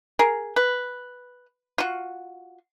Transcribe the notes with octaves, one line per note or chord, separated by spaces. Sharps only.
G#4 A#4
B4
F4 F#4